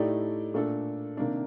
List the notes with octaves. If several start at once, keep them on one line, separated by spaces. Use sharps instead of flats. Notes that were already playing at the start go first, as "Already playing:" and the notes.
Already playing: A2 A3 D#4 G4 D5
A#2 A3 D4 A4
C3 D#3 A#3 D4